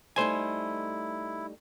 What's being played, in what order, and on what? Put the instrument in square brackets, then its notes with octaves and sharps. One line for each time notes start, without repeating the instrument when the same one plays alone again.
[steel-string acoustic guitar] G3 A3 D#4 [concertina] E4 [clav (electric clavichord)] C5 G#5